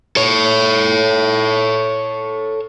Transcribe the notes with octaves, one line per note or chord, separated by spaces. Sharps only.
A4 C#5